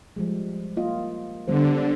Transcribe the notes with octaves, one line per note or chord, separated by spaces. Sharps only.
F3 G3 G#3
A#3 F4 D#5
D3 G3 B3 C5